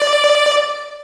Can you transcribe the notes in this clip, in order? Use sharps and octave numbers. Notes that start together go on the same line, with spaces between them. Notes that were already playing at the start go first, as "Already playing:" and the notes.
Already playing: D5